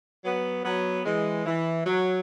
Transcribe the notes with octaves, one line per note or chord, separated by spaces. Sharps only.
F#3 B3
F#3 B3
E3 G#3
E3
F#3